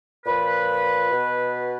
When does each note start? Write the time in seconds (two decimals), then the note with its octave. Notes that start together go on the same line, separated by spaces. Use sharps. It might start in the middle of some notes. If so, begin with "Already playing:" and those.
0.26 A#2 F3 B4
1.12 B2